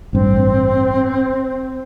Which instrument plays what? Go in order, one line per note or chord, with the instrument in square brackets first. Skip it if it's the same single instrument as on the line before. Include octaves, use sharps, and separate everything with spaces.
[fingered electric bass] A1 G2 [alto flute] C4